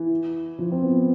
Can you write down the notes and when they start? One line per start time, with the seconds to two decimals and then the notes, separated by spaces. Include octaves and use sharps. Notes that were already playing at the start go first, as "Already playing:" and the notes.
Already playing: E3
0.59 F3
0.72 C4
0.83 B3